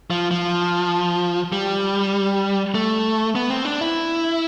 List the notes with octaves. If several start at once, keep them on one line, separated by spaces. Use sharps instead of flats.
F3
F3
G3
A3
B3
C4
D4
E4